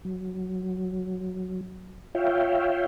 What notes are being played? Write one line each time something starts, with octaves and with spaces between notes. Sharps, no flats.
F#3
F4 C#5 E5 F5 G5